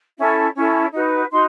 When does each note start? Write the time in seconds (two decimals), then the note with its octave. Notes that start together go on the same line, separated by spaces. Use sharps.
0.17 C#4 E4 A4
0.55 C#4 E4 A4
0.92 D#4 F#4 B4
1.30 D#4 F#4 C6